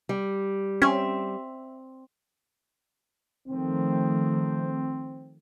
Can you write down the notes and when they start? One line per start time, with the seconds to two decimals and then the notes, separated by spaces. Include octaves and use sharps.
0.09 G3
0.82 C4 C#4 E5
3.49 D#3 F3 A3 C4